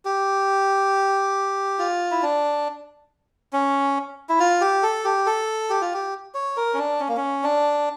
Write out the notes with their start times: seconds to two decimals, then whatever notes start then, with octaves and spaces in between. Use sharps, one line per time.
0.05 G4
1.79 F4
2.11 E4
2.23 D4
3.53 C#4
4.29 E4
4.40 F4
4.61 G4
4.83 A4
5.05 G4
5.26 A4
5.70 G4
5.81 F4
5.94 G4
6.34 C#5
6.57 A#4
6.74 C#4
6.78 D4
7.00 C#4
7.09 A#3
7.17 C#4
7.43 D4